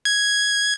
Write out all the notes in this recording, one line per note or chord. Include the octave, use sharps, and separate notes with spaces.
G#6